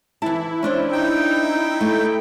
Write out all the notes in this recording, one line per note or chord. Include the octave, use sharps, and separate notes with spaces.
E3 E4 A5
C#4 D4 C5
D#4 G5
A3